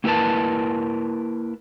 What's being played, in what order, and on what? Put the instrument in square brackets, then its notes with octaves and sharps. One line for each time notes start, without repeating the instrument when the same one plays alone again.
[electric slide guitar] A#3 E4 G#4 A#4 B4 A5